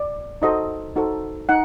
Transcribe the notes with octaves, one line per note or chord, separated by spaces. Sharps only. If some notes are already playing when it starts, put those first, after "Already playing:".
Already playing: D5
D#4 F#4 A4 C5 D#5
D#4 F#4 A4 C5
D#4 F#5